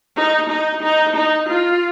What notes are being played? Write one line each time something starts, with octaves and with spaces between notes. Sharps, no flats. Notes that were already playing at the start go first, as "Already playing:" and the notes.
D#4
D#4
D#4
D#4
F4